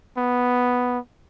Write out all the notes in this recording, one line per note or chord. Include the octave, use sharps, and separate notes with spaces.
B3